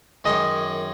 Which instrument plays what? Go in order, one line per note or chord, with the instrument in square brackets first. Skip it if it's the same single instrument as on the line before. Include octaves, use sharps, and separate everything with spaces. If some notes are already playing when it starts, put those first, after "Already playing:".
[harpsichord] F#2 D#3 G#3 [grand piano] D#5